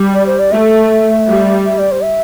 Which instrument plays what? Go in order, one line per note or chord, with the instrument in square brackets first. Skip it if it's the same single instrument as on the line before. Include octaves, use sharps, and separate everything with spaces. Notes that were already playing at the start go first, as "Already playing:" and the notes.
Already playing: [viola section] G3
[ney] D5
C5
D5
[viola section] A3 [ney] E5
[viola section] G3
[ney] E5
D5
C5
E5